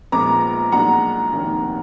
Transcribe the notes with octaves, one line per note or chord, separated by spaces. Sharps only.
A#1 A#2 F3 G#3 B3 A#5 D6
B1 A#2 G#3 D4 F#5 A#5
F1 D#2 D#3 A#3 D4